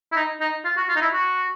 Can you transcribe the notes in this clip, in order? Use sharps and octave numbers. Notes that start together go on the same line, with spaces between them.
E4
D#4
D#4
F4
F#4
F4
D#4
E4
F#4